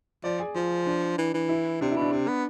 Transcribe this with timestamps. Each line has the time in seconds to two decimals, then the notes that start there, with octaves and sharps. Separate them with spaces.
0.24 F3 D5
0.40 G#4
0.55 F3 F4
0.87 D4
1.18 E3
1.34 E3
1.49 E4
1.81 C3 D4
1.91 B2 E4
2.01 D4
2.12 C3
2.28 B3